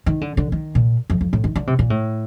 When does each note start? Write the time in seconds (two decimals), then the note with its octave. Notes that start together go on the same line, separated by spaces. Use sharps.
0.06 D#3
0.21 D3
0.37 D3
0.52 D#3
0.75 A#2
1.10 F2
1.21 F2
1.33 A2
1.44 D#3
1.56 D3
1.67 C3
1.79 A#2
1.90 A2